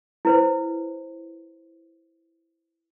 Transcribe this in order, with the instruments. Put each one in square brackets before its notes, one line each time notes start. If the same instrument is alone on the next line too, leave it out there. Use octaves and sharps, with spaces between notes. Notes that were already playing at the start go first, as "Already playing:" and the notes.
[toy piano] E4 B4 C5